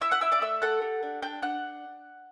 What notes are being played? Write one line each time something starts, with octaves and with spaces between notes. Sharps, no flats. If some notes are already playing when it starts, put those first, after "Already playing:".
E4 E5 E6
F#5 F#6
E4 E5 E6
D5 D6
A3 E5 E6
A4 F#5 F#6
G4
D4
D4 G5 G6
D4 F#5 F#6